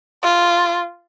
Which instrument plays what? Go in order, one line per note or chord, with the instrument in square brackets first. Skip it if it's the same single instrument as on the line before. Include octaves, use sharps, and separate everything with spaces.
[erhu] F4